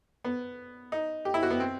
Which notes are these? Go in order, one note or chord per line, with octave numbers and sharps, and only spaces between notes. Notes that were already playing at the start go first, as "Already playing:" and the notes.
B3
D#4
G4
E4
F#4
B3
C4